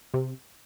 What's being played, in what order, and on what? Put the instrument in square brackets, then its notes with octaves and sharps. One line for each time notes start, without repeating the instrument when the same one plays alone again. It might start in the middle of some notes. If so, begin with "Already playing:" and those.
[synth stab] C3